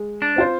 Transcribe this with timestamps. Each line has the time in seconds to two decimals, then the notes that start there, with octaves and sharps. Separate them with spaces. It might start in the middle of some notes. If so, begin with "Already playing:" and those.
Already playing: G#3
0.22 D4
0.36 C4 F4 C5